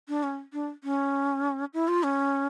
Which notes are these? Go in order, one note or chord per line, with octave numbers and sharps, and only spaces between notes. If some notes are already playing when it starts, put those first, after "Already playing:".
D4
C#4
D4
C#4
E4
F4
C#4